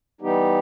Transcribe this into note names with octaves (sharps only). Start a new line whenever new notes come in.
E3 G3 B3 D#4 G4